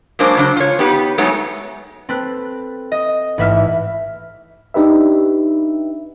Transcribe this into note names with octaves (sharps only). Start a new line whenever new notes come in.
F#3 G#3 A#3 D4 C5
C#3 F#3 D4 C5
F4 C#5
B3 D#4 G4 B4
F#3 G#3 A3 B3 D#4 C#5
C4 A4 B4 F#6
D#5
A1 G#2 B4 E5 F6
D4 D#4 G4 B4 E5